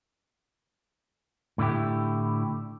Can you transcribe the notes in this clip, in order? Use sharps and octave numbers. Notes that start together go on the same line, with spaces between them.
A2 D3 E4 G4